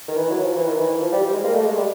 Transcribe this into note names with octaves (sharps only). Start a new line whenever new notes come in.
D#3
E3
F#3
F3
E3
D#3
E3
F3
G3
G3
G#3
A#3
A3
G#3
G3